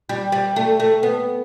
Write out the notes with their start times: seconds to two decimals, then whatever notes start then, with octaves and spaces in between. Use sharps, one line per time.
0.09 G3
0.32 G3
0.56 A3
0.80 A3
1.03 B3